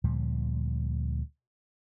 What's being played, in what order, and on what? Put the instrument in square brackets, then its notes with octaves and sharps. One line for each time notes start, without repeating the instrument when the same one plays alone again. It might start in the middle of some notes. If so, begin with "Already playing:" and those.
[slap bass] D2 A#2 F3 G3